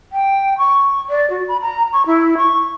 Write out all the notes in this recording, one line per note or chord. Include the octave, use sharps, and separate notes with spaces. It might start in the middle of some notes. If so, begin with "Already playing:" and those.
G5
C#6
D5
F#4
B5
A#5
C#6
E4
C#6